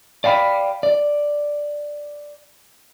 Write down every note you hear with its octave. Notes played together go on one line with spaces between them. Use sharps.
D5 F5 G5 B5
D5